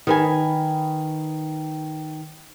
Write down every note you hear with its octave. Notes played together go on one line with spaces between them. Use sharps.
D#3 B4 G#5